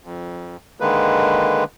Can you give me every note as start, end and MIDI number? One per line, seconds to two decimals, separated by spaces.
0.05 0.56 41
0.80 1.64 50
0.80 1.64 51
0.80 1.64 56
0.80 1.64 58
0.80 1.64 71